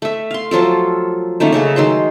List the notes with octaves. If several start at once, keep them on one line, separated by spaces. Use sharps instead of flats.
A3 E5
F5 C6
F3 F#3 F4 A4
D#3 A3 A#3 C#4
C#3 A3 A4 A#4
D#3 F#3 G#3 C6